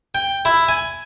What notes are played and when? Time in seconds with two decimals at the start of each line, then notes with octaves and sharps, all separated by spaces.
0.15 G5
0.45 E4
0.69 G#5